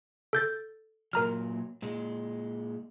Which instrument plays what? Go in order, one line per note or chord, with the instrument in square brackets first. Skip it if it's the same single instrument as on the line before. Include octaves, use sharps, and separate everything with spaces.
[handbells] A4 G6 A6
[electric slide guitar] A#2 F#3 [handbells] A#4 A#5 F6
[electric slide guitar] A#2 G#3